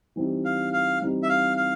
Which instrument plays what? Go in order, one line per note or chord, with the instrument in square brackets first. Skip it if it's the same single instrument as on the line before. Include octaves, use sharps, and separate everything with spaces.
[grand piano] E3 G3 C4 D#4 G4
[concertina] F5
F5
[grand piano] E3 G3 C4 D#4 G4
[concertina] E5
F5
F5